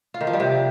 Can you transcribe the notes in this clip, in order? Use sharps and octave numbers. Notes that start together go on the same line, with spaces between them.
F4
D#3
F3
G3
C3